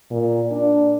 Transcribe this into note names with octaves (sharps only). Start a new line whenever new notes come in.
A#2
D4